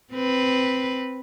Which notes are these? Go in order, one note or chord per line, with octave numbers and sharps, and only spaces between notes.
C4 B4